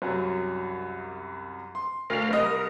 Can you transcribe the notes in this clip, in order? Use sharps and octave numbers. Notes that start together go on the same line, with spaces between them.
C2 F#2 F#3
C6
D2 A#4 F5
C2 A#4 D#5